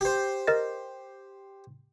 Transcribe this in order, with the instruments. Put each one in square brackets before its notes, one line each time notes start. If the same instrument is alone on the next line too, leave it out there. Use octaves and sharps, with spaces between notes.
[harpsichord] G4 C5
[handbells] A#4 D#5 A6